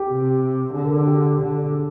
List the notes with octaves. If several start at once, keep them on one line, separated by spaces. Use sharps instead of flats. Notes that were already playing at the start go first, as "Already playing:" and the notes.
Already playing: G4
C3
D3 G#4
A#4
G4
D3
G#4